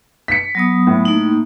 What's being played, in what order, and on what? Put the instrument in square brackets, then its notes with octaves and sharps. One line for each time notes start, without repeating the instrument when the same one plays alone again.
[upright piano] B6 C#7
[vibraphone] F#3 B3 D#6
[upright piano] A2
[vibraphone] A#3 D#4